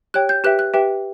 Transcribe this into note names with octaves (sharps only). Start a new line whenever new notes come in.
G4 C#5 G5 F#6
G6
G4 B4 E5 G5 F#6
F#6
G4 B4 E5 G5